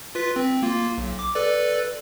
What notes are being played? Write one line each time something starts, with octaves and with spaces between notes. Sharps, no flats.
F4 B4 B6
C4
A#3 F4
B1
D6
A4 B4 D5